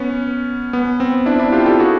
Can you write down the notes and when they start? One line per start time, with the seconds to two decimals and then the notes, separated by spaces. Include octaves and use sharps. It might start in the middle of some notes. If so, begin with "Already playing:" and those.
Already playing: B3 C#4
0.73 B3
1.00 C4
1.26 D4 E4
1.39 D4 E4
1.52 F4 G4
1.66 G4 A4
1.79 F#4 G#4